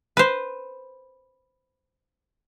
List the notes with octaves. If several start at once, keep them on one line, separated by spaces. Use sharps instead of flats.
B4 C5